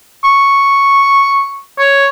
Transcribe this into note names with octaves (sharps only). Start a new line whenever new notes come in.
C#6
C#5